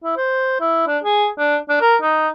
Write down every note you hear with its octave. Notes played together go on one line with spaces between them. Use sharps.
E4
C5
E4
D4
G#4
D4
D4
A#4
D#4